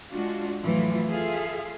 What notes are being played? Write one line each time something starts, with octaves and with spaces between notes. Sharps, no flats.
G#3 D4 F4 F#4
F2 A2 E3 F#3 F4
F4 G#4 A4 E5 F5